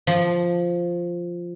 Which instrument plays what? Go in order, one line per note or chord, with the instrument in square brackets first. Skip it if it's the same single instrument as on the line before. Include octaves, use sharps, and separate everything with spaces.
[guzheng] F3